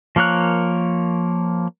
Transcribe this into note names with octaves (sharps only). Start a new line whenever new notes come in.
F3 A#3 A#4 C#5 F#6